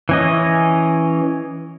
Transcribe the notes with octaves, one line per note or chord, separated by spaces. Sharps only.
E3 C#4 D#5